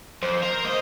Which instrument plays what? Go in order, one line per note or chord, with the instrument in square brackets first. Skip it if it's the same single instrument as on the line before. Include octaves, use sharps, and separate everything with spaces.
[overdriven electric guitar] F2 [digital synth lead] C5
[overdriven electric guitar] A#4
C#2 D#5